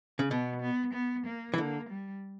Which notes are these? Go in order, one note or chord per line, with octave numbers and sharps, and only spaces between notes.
C#3
B2 B3
B3
B3
A#3
E3
D3 A#3
G3